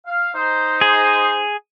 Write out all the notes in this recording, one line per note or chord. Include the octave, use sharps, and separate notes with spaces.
F5
D#4 C5
G#4